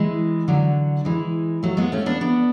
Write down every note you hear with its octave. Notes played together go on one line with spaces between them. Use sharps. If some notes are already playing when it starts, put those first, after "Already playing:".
Already playing: E3 G#3
D3 F#3
E3 G#3
F#3 A3
G#3 B3
A3 C#4
B3 D4
B3 D4